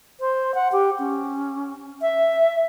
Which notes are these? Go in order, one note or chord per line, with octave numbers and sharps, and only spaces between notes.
C5
F#5
G4
C#4
E5